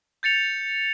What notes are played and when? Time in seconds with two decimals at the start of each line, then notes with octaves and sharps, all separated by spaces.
0.23 G6 A6 C#7 F7